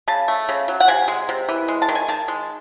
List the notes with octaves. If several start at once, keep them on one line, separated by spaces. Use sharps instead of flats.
C#3 A5
A3
C#3
F#3
F#5
C3 G#5
G#3
C3
E3
G#3
A5
D#3
G#5
D#3 A5
G#3